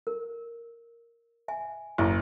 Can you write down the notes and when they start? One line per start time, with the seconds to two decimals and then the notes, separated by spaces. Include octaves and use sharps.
0.07 A#4
1.48 E5 G#5
1.98 F#1 E4 E5 C#6